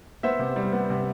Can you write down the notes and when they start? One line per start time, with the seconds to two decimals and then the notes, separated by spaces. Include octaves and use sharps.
0.23 B3 C5 E5
0.39 C3
0.56 G3
0.73 B3
0.90 C3